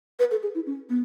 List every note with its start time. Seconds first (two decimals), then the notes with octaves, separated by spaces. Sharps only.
0.19 B4
0.31 A4
0.43 G#4
0.55 E4
0.66 C#4
0.89 B3